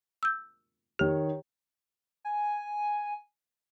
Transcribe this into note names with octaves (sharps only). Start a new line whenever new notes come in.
E6 G6
D#3 G4 C#5
G#5